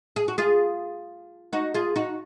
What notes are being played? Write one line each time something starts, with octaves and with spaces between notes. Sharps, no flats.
G#4
F#4
F4 G#4
D#4 F#4
F4 G#4
D#4 F#4